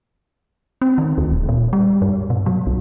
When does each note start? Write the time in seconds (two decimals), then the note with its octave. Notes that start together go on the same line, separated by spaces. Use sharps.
0.82 C4
0.98 D#3
1.18 D2
1.31 D1
1.49 A#2
1.73 G3
2.02 G2
2.30 B2
2.46 F#3
2.67 B1